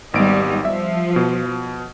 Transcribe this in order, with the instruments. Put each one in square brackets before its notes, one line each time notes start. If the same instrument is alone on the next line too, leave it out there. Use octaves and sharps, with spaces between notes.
[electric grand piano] G#1 D7 [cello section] G3 B3 D#4
[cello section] F3 [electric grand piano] E5
[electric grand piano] B2